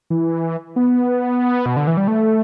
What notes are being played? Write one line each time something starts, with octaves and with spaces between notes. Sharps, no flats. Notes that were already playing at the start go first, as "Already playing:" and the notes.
E3
B3
B2
D3
E3
G3
A3